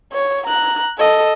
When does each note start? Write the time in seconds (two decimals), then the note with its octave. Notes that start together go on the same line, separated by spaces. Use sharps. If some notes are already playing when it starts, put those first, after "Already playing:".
0.12 C#5
0.46 A#5 F#6
0.98 A4 D#5